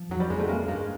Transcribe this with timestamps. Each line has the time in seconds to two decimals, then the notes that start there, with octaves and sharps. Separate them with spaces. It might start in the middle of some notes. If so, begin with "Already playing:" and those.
Already playing: F3
0.09 F2 F#3
0.20 G3
0.30 F2 G#3
0.40 A3
0.48 G3 G#3 A#3
0.68 G2 G#3 A#3